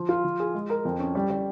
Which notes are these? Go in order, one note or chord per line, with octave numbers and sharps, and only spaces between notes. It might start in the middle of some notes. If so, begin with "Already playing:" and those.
Already playing: F3
F4
F3
G#4
G#3
A#4
F2
C#4
G3
G3